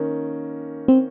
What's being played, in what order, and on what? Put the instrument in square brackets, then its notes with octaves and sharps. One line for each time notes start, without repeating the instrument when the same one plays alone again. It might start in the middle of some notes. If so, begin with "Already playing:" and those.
Already playing: [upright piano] D#3 A#3 C#4
[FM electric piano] C4